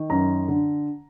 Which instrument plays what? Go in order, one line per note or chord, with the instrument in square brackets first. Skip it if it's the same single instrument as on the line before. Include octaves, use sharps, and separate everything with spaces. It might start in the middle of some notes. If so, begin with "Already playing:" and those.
Already playing: [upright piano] D#3
F#2 A#5
D3